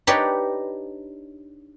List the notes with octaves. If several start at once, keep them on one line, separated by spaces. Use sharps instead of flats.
D4 D#4 G4 B4 C#5 D5